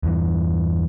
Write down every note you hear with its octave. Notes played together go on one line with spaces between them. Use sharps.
E2 G2 E3